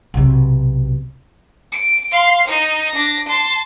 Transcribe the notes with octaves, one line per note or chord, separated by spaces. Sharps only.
B1 C3
D7
F5 C6
D#4 D#7
D4 A#6
A5 C6